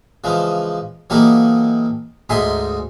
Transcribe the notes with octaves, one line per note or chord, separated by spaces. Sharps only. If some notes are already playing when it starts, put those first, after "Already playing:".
C#3 E3 F3 G#3
E3 F#3 A#3 D#4 G4 A4
D2 G#2 D#4 E5 G#5 C6